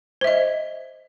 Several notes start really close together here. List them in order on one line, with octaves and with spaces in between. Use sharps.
C5 E5 D#5